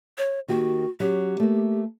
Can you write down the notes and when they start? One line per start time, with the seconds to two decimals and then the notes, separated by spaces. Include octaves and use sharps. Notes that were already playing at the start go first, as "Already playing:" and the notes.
0.18 C#5
0.48 D#3 A#3 F#4 G4
1.00 F#3 C#4 G4
1.40 A3 A#3